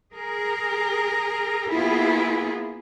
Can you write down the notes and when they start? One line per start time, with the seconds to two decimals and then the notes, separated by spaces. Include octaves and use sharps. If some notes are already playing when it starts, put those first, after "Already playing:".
0.13 G#4 A#4
1.70 A#3 B3 E4 F4 G#4